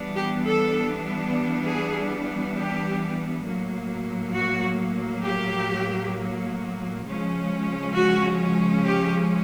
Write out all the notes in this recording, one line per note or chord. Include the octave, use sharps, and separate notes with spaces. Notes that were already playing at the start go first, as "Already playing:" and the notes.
Already playing: E3 G3 B3 D4
G4
A4
G#4
G4
A2 F#3 A#3
F#4
G4
C#3 F3 G#3 C#4
F#4
G4